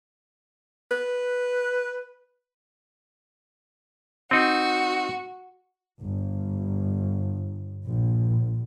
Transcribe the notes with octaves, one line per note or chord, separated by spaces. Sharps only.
B4
C4 D#4 F#4
G1
A#1